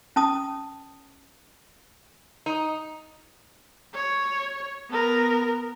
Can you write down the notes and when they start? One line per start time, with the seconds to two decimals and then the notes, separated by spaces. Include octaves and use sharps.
0.16 C#4 A5 D#6
2.46 D#4
3.94 C#5
4.90 B3 A#4